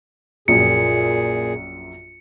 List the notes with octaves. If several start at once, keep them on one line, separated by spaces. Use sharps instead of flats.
A#1 F#2 A#2 G#4 C#7